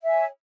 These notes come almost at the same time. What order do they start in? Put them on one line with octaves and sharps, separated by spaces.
E5 G#5 C#5